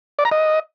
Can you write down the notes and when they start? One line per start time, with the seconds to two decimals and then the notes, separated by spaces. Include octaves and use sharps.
0.19 D5
0.25 A#5
0.32 D#5